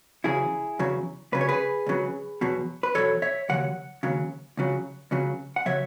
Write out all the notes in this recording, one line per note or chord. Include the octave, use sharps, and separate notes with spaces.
E2 C#3 F#3 E4 G#4
E2 C#3 F#3
C#2 C#3 F#3 B4
C#5
G#4 B4
C#2 C#3 F#3
E2 B2 F#3
B4
E2 B2 F#3 A4 C#5
C#5 E5
D#2 C#3 F#3 F#5
D#2 C#3 F#3
C#2 C#3 F#3
C#2 C#3 F#3
F#5
C#3 F#3 C#5 E5